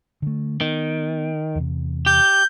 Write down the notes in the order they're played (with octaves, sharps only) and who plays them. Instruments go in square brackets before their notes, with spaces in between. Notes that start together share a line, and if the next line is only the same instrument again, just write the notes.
[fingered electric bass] D3 A3
[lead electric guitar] D#3 [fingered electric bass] B3
[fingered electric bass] E2 C3
[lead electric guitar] G4 [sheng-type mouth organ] G6